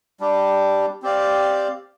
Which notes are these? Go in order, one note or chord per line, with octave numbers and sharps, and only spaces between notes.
G3 D4 G4
C4 G4 D5 F5